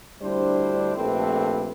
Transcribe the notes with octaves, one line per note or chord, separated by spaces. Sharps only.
D2 G3 D4 E4 C5
A#1 A3 C4 G4 A4 B4